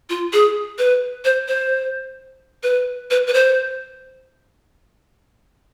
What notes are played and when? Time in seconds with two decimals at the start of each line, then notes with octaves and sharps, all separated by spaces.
0.10 F4
0.33 G#4
0.78 B4
1.25 C5
1.48 C5
2.63 B4
3.11 B4
3.27 B4
3.34 C5